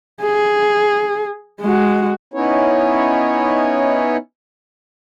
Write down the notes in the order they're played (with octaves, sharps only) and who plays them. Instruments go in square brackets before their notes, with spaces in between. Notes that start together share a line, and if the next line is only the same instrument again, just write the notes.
[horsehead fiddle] G#4
G#3 F#4
[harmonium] B3 C#4 D#4 E4 C#5